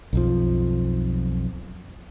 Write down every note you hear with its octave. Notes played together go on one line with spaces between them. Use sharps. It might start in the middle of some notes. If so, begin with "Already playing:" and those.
B1 F2 F3